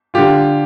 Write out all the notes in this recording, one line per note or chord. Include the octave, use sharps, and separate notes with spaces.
D3 F4 G4